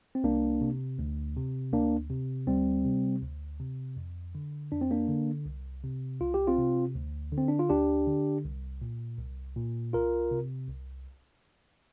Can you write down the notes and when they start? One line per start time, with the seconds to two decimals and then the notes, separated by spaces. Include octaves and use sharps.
0.15 C4
0.24 C2 A#3 D4
0.61 C3
0.99 D2
1.36 C3
1.73 D2 A#3 D4
2.10 C3
2.47 D2 G3 C4
2.85 C3
3.22 D2
3.60 C3
3.96 F2
4.35 D3
4.71 F2 D4
4.81 C4
4.91 A#3 D4
5.08 D3
5.46 C2
5.84 C3
6.20 C2 F4
6.34 G4
6.47 C4 F4
6.58 C3
6.95 D2
7.32 D3
7.37 C4
7.48 D4
7.59 F4
7.70 D2 D4 G4
8.07 D3
8.45 C2
8.82 A#2
9.19 C2
9.56 A#2
9.93 C2 F4 A#4
10.31 C3
10.68 C2